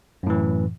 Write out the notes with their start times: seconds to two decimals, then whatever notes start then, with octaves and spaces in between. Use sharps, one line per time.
0.23 F#2
0.27 A2
0.30 E3